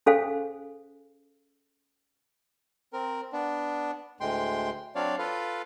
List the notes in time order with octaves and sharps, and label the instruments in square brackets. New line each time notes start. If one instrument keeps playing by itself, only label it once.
[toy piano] C#4 G#4 A4 C5 F5 G#5
[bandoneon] C4 A#4
B3 D4
D2 A2 G#3 G5 C6
F#3 C4 D4 C#5 D5 F5
F4 A4 B4 F5